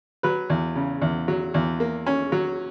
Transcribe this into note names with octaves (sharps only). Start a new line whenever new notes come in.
F#3 B4
E2
C#3
E2
F#3
E2
A#3
C#4
F#3